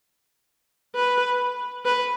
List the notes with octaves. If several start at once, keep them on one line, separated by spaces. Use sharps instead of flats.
B4
B4